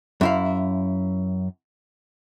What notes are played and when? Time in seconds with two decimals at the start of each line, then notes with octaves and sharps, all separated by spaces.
0.21 F#2 E4 F5